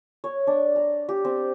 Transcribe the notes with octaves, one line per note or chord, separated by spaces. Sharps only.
C#5
D4
A#5
G4
C4